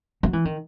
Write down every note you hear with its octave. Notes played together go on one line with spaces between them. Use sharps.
F#3
E3
D#3